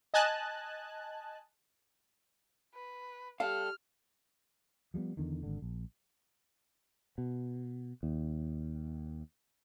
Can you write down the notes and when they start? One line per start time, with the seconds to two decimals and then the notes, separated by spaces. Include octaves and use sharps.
0.14 D#5 G#5 A5 F#6
2.74 B4
3.40 G3 A4 F5 F6
4.94 F3 G3 G#3 B3
5.17 E2 D3 D#3
5.43 G#1 D3
5.62 A#1
7.18 B2
8.03 D#2